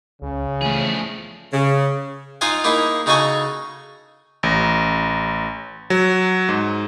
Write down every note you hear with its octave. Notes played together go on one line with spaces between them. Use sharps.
C#2 C#3
E3 F3 A3 G#4
C#3
D#4 F4 D#5 F5 F#5 G#5
A#3 D#4 E4 G#4
C#3 D#4 F#4 A4 G#5 C#6
A1
F#3
G#2